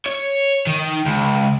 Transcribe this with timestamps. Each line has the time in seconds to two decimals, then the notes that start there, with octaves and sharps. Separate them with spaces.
0.06 C#5
0.67 D#3
1.05 C#2